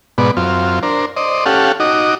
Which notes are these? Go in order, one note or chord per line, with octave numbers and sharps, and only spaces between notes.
G#2 B2 B3 D5
F#2 C4 F4
D4 A#4 C5
C5 D5 D#5
C#4 G4 A4 F5 F#5
D#4 F#4 D#5 D6